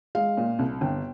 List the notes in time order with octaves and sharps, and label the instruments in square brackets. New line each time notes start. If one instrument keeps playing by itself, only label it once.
[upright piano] G#3 [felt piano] F5
[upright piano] A#2
C2
[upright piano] G1 [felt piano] G5